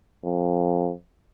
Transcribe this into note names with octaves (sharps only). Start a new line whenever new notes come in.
F2